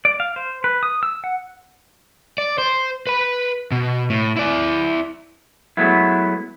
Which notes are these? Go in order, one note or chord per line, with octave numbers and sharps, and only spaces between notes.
D5
F5
C5
B4
D#6
E6
F#5
D5
C5
B4 B5
B2
A2
E4 D5
F#3 G#3 A3 B3 E4